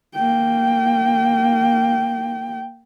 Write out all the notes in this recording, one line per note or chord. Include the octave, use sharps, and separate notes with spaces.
A#3 G5